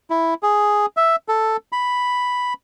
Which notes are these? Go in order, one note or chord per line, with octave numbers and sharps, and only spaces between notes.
E4
G#4
E5
A4
B5